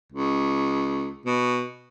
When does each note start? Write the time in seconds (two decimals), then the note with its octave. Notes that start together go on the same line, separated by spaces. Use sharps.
0.12 C#2
1.26 B2